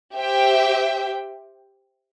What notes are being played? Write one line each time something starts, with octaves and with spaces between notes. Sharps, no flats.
G4 C5 E5 G5